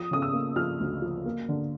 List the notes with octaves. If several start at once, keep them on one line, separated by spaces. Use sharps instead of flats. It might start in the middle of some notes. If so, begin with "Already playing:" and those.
Already playing: F3 D#6
C#3 D#6
E6
A#3
F3 F6
D2
F3
A#3
D3